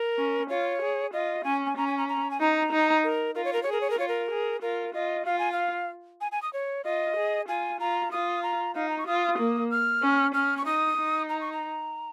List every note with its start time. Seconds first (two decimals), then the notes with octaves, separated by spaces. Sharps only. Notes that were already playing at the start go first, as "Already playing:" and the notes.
Already playing: A#4
0.18 C#4
0.50 F4 C#5
0.82 G#4
1.13 F4 D#5
1.44 C#4 G#5
1.66 G#5
1.77 C#4 A#5
1.87 G#5
1.98 A#5
2.09 A#5
2.31 G#5
2.40 D#4 A#5
2.72 D#4
3.04 A#4
3.35 F4 A#4
3.45 C#5
3.53 A#4
3.63 G#4 C#5
3.72 A#4
3.81 C#5
3.90 A#4
3.99 F4 C#5
4.08 A#4
4.31 G#4
4.62 F4 A#4
4.94 F4 D#5
5.26 F4 F5
5.39 G#5
5.52 F5
6.21 G#5
6.32 G#5
6.42 D#6
6.53 C#5
6.84 F4 D#5
7.16 G#4
7.48 F4 G#5
7.80 F4 A#5
8.12 F4 D#6
8.43 A#5
8.75 D#4 F5
8.89 A#5
8.98 C#6
9.07 F4 D#6
9.38 A#3
9.71 F6
10.02 C#4
10.34 C#4 F6
10.57 C#6
10.65 D#4 D#6
10.97 D#4
11.29 A#5
11.41 C#6
11.52 A#5